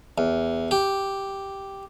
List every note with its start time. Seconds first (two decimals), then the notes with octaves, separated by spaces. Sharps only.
0.18 E2
0.71 G4